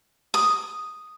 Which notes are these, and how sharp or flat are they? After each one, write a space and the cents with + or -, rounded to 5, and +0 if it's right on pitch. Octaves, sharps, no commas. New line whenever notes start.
D#6 +0